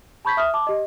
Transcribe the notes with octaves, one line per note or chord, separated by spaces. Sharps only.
A5 B5 C#6 G6 G#6 B6
E5 D#6 F6
A5 D6
G4 D#5